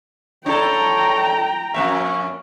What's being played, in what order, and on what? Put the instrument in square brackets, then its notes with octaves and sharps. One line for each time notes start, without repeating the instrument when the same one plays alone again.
[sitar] D4 E4 A4 [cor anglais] C#5 [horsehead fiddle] G5 A#5
[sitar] F2 A#3 E5 [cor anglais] C#4